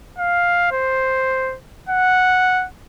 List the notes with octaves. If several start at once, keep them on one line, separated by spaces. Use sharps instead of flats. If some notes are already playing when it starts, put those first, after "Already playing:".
F5
C5
F#5